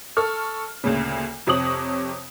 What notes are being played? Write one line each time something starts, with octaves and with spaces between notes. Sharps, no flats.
A4 C#6 F6
D2 A#2 C#3
F2 C3 C#5 D#6 F#7